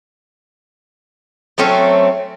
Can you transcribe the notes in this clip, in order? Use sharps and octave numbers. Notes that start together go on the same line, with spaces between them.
F#3 A3 C4 C#4